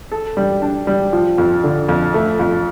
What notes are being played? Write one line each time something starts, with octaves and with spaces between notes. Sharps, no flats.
A4
G3
D4
G3
F3
F2
D3
F2
A3
F2